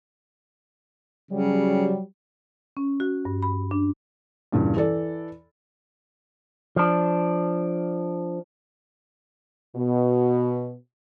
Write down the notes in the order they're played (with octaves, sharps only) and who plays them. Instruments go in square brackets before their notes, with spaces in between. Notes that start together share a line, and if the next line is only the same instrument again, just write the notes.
[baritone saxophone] C#3 [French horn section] F#3 G3
[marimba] C#4
F#4
G2
B5
D4
[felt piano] E2 G2 A#2 C#3
E3 A4 D5
[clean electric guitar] F3 D4
[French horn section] B2